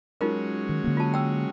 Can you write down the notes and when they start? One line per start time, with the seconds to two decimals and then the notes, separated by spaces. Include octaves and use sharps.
0.21 F#3 G#3 C#4 D#4 F4 A#4
0.69 D#3
0.84 D3 A#3
0.97 F4 A5
1.14 G5 E6